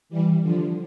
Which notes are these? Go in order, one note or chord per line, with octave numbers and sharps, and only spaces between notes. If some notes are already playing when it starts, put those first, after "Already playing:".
E3 G3
D3 F3